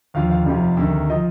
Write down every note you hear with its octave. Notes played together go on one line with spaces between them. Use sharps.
D#2 D3 F3 F5
F5
F1 F2 C3 F3
D2 C3 D#3
F3 D#5